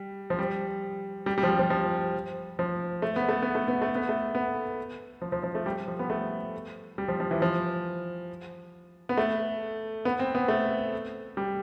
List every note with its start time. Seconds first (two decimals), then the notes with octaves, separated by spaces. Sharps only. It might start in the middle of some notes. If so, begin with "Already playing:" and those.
Already playing: G3
0.30 F3
0.39 G3
1.26 G3
1.38 G3
1.43 F3
1.49 G3
1.59 F3
1.70 F3
2.59 F3
3.02 A3
3.16 B3
3.29 A3
3.42 B3
3.55 A3
3.68 B3
3.82 A3
3.95 B3
4.09 A3
4.35 B3
5.22 F3
5.32 F3
5.43 F3
5.55 A3
5.66 G3
5.88 F3
5.99 B3
6.10 A3
6.98 G3
7.08 F3
7.20 F3
7.31 E3
7.42 F3
9.09 B3
9.18 A3
10.05 B3
10.19 C4
10.35 B3
10.48 A3
11.37 G3